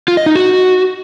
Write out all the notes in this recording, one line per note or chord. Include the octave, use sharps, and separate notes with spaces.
F4
D#5
D#4
F#4